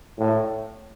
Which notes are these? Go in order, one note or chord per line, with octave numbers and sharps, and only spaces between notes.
A2